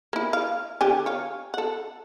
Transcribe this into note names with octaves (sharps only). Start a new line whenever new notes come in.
A#3 E4
F5
D3 G4 G#5
C#5 F5
A4 F#5